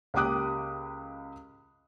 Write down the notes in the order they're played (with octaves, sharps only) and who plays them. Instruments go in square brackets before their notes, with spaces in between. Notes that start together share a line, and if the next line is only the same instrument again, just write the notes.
[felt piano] C#2 A#3 G4 D6 D#6 F#6